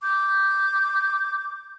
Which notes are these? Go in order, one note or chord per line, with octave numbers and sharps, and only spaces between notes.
D6 G6